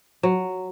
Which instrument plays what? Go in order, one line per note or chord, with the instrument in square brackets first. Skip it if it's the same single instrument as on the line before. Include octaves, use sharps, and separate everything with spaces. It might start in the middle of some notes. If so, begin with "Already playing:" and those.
[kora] F#3